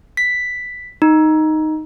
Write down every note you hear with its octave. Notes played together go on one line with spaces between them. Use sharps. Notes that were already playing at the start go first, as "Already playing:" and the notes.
B6
D#4